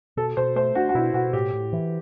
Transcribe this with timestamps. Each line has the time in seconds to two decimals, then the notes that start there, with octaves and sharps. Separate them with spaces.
0.17 B2 A4
0.37 B2 C5
0.56 A3 C5
0.75 D4 F#4
0.89 F#4
0.95 B2 E4
1.14 B2 F#4
1.33 A2 G4
1.53 A2
1.73 E3